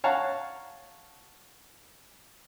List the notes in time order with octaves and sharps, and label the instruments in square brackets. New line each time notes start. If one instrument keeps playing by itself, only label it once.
[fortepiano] C#5 F5 F#5 A5 A#5